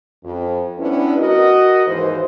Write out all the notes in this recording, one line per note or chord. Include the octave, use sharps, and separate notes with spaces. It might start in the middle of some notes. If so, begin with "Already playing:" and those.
F2
G3 B3 C#4 D4 E4
F#4 A#4 D#5
D#2 G#2 E3 C5